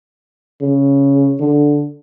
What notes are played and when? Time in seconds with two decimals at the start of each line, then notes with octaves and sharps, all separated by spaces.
0.61 C#3
1.40 D3